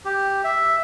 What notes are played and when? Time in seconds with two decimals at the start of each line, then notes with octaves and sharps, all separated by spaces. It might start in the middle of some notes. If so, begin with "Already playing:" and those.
0.05 G4
0.44 E5